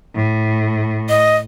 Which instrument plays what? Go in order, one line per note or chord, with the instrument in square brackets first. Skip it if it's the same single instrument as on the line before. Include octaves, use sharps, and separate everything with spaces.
[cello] A2
[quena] D#5